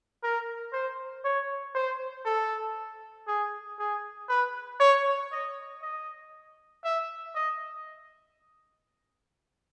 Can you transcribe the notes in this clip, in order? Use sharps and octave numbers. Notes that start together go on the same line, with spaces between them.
A#4
C5
C#5
C5
A4
G#4
G#4
B4
C#5
D#5
D#5
E5
D#5